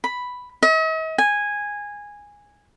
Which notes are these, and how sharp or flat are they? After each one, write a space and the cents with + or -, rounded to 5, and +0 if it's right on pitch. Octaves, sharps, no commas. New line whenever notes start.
B5 +0
D#5 +45
G#5 -10